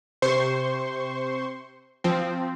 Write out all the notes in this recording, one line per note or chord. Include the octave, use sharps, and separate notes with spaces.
C3 C5 C6 C#6
F3 C4